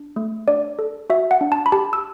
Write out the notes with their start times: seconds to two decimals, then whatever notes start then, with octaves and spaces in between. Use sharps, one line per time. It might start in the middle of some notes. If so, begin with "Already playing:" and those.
Already playing: D4
0.16 A3
0.48 D4 D5
0.79 A4
1.10 F#4 E5
1.31 F#5
1.41 D4
1.52 A5
1.66 B5
1.72 G4 A5
1.93 E6